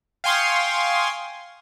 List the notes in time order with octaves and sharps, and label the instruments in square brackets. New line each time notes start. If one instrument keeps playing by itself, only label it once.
[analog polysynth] F5 G5 G#5 C6 C#6 D#6